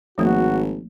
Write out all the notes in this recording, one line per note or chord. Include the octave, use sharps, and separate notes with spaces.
G#1 F3 A3 A#3 F#4